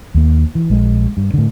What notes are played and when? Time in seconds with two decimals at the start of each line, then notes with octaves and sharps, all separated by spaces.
0.14 D#2 A#3
0.55 E3
0.70 A#1 G#3
1.17 G2
1.34 A2 D3